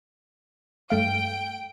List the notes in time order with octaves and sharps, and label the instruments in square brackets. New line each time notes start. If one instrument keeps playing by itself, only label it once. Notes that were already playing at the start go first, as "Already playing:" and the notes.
[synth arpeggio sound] G2 A3 F5 [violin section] G5 D7